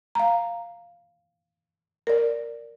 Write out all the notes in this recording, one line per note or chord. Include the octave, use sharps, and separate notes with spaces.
F5 A#5
A#4 D5